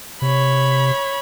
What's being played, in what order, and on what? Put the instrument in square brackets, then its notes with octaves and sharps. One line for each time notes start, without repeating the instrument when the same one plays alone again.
[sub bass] C3 [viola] C#5 B5